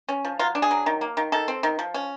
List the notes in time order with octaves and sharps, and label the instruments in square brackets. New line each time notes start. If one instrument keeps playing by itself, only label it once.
[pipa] C#4
F3
F#3 F4
D4
G#4
F#3
D#3
A#3
D#3
D#3 A4
C4
D#3
F3
C#4